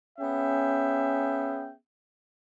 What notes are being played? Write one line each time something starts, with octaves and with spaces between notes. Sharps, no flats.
B3 C#4 G#4 E5 G5